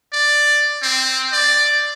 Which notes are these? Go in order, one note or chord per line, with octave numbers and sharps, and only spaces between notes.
D5
C4
D5